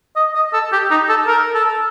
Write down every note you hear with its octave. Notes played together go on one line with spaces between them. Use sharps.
D#5
D#5
A4
G4
D#4
A4
A#4
A4